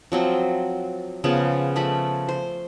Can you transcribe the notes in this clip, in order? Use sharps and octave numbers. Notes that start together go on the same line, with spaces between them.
F3 F#3 C4
C#3 F3 B3 G#4
F3 A3 B5
C5